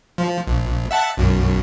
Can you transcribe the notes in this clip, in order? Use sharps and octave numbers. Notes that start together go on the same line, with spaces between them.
F3
A#1
E5 F#5 A5
B1 F#2